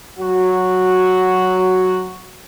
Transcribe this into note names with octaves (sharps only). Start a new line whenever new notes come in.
F#3 F#4